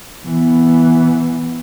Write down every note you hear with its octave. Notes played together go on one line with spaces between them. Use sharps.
E3 B3